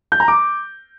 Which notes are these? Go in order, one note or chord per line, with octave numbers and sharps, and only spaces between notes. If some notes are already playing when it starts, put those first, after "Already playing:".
G6
A#5
D6